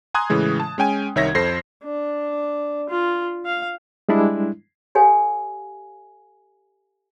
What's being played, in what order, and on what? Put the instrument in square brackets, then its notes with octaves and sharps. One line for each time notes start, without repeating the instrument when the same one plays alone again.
[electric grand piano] G#5 A#5 C6 D#6 F#6 G#6
A2 C#3 E3 G#3
A5
G#3 C#4 G5 G#5
C2 D#3 C#5 E5 G#6 A#6
F2 A4 C5 A#6 C7
[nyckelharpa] D4
F4
F5
[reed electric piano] G3 G#3 D4 E4
[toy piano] G4 A4 C#5 F5 F#5 G#5